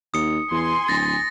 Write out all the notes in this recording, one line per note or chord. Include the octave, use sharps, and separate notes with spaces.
D#2 D#6 C#7
E2 G#5 C6
D1 A6 A#6